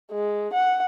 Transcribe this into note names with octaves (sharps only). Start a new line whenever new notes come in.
G#3
F#5